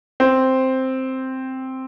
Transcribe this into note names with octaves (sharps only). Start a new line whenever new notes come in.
C4